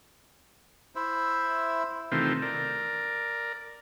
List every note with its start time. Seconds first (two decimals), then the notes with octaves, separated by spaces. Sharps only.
0.95 E4 C5 E5
2.12 C3 D#3 E3 A3 C4 F4
2.42 A#4 D5